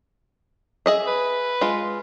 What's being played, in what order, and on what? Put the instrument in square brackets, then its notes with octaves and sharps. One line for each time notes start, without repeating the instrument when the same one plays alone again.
[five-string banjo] G#4 D#5 E5
[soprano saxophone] B4
[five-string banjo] G#3 F4